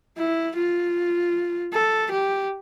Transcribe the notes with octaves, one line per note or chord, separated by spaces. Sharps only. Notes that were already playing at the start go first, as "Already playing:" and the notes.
E4
F4
A4
G4